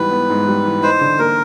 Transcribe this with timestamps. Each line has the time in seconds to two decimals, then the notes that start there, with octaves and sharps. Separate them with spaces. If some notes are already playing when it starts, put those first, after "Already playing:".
Already playing: G#2 E3 G3 B3 B4
0.11 B3
0.30 G#2
0.48 G3
0.65 E3
0.83 D#4 C5
1.01 D3
1.19 A#3 A#4